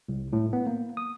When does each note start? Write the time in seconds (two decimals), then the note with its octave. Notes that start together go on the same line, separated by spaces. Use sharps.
0.09 C2
0.33 A2
0.53 B3
0.66 A#3
0.97 D#6